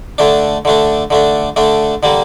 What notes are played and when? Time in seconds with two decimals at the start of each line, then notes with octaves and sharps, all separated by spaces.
0.18 D3 A3 D4
0.65 D3 A3 D4
1.10 D3 A3 D4
1.56 D3 A3 D4
2.03 D3 G3 A#3